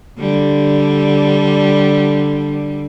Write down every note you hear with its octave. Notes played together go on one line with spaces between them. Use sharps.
D3 G3